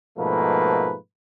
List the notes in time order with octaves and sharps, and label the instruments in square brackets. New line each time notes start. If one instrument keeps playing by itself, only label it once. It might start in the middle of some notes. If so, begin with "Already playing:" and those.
[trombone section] G#2 B2 F3 A3 A#3 B4